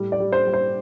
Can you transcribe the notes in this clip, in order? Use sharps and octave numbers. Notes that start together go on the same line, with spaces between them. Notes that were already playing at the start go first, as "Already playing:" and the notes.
Already playing: A2 G3
D5
G3
C5
G3
C5